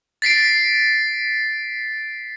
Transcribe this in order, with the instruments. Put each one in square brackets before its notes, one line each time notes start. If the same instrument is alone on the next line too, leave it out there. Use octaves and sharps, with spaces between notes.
[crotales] A6 B6 C7 D7